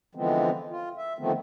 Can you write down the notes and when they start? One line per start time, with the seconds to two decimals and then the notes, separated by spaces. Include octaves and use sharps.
0.15 D3 E3 F3 G#3 B3 C4
0.69 F4
0.98 E5
1.19 D3 D#3 F3 A3 B3 C4